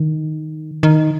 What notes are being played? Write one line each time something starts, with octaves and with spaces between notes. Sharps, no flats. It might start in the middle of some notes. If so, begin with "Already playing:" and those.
Already playing: D#3
D#3